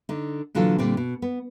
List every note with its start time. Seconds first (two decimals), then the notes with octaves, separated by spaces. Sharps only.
0.09 D3 D#4
0.55 A#2 D3 E3 F#3 F4 A4
0.78 A#2 D3 G3 C4
0.97 B2
1.22 B3